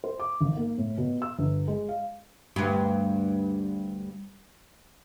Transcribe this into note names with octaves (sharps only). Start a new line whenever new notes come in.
C5
D6
G#1
A#3
A2
B2
E6
G1
G#3
F5
D2 G2